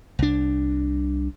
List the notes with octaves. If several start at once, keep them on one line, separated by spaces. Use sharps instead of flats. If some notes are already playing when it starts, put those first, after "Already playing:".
C2 D4